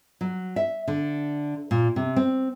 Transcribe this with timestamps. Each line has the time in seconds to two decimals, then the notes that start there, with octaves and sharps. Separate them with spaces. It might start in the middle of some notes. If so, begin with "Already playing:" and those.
0.21 F#3
0.56 E5
0.88 D3
1.71 A#2
1.96 C3
2.16 C4